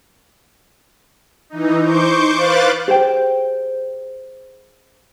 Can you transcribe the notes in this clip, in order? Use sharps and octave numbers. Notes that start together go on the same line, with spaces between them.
E3 D#4
C5 C#6 D6 G6
B4 C5 F5 D6 F#6 A6
G4 G#4 C5 G5